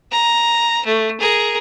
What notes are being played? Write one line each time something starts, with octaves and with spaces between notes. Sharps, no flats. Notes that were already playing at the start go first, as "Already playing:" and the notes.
A#5
A3
G#4 A#4